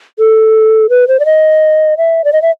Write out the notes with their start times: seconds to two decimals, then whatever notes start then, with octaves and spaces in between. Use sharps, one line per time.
0.19 A4
0.90 B4
1.08 C5
1.20 D5
1.25 D#5
1.97 E5
2.24 D5
2.33 D#5
2.42 E5